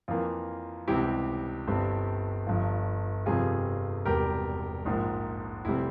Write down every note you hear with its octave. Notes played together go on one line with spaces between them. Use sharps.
F2 E3 A#3 F4
C#2 C3 E3 G3 C4 E4 G4
G1 G2 G3 C4
G1 G2 F3
G1 F2 C3 G3 F4 G#4
E1 E2 C3 G3 G4 A#4
A#1 G#2 F3 A#3
F1 C3 G3 C4 E4